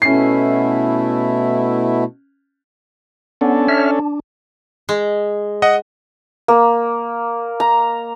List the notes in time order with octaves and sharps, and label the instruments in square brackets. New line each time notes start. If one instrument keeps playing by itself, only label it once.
[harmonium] B2 A3 E4 [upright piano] C#4 C7
[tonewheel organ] B3 [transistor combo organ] C#4 D4 A4
[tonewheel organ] C#5 E5 F6
D4
[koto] G#3
[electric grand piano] D#5 F#5
[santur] A#3
A#5